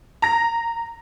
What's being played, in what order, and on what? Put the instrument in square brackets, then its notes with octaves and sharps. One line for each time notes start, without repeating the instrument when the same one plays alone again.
[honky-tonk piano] A#5 A#6